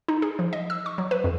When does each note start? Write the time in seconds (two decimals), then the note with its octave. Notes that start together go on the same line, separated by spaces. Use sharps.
0.08 D#4
0.22 G#4
0.39 F3
0.53 D#5
0.70 E6
0.86 C#6
0.98 F#3
1.11 B4
1.24 F2